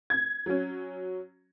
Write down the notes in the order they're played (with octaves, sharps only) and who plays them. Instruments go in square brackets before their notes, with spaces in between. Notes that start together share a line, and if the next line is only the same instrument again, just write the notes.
[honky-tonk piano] G#6
F#3 C#4